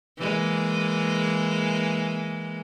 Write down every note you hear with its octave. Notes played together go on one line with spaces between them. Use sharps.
E3 G#3 A#3